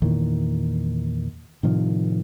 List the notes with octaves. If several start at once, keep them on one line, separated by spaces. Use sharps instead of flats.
E2 A#2 D#3 E3
A2 C3 D#3 F3